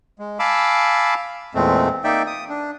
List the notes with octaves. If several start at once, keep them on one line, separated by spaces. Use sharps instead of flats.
G#3
F5 G#5 A5 B5 D6 E6
E2 A#2 G#3 A3 C4
A#3 D#4 D5 E5 G5
D#6
D4